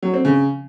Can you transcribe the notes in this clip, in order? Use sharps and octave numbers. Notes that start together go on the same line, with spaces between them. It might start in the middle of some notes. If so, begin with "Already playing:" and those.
F#3
C4
C#3